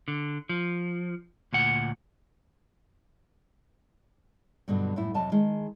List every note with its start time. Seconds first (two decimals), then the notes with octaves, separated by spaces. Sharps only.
0.08 D3
0.49 F3
1.53 D2 A#2 F#5
4.68 G2 B2 D3 F#3
4.96 F#2 A2 E4
5.14 F2 C3 F#3 D#5 A5
5.32 D#3 G#3 G#4